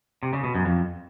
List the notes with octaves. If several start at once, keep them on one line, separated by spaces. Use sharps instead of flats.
C3
C#3
B2
F#2
F2